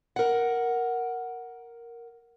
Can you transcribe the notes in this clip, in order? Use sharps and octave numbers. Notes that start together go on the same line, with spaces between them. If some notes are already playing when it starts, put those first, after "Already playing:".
A#4 F#5